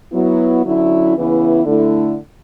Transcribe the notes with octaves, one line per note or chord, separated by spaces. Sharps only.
F#3 B3 E4
D3 F#3 C#4 E4
C#3 E3 B3 E4
D3 A3 E4